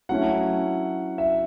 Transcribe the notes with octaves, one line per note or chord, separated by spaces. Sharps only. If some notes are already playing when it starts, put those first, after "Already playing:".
F#3 A3 C#4 E4 F#5
E5